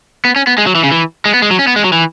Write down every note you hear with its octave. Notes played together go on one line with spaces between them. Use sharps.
B3
C#4
B3
G#3
F#3
E3
C#3
E3
G#3
B3
G#3
F#3
C#4
B3
G#3
F#3
E3